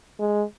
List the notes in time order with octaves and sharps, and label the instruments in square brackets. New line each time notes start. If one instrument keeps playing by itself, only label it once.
[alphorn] G#3